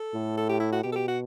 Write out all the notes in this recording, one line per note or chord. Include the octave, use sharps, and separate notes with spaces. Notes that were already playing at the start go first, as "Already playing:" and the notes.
Already playing: A4
A2
A4
G4
E4
F#4
B2 G4
A4
G4
F#4